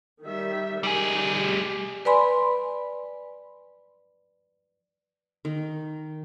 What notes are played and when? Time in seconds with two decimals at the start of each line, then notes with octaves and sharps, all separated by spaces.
0.24 D#3 G3 E5
0.83 G3 D#4 G4 G#4
2.05 B4 D5 G#5 B5 C6
5.45 D#3